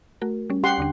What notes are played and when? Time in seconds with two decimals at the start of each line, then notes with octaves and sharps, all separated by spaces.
0.22 A3 F#4 A#4
0.50 G3 C#4
0.64 G4 F#5 C6
0.78 D#2 D3 D4